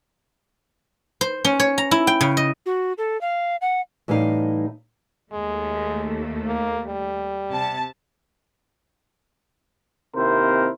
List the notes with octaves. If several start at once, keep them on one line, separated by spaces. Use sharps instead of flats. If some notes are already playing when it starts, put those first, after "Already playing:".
C5
C#4
C#5
A#5
E4
G5
C#3
D#5
F#4
A4
F5
F#5
A2 E3 G3 C#4 D#4 F5
D#2 G#3 A3
A#3
G3
C3 A5
D#2 C3 C4 E4 A#4 C5